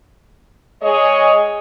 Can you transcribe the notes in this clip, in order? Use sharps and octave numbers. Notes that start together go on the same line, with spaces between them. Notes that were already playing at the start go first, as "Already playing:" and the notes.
G#3 G#4 C#5 D#5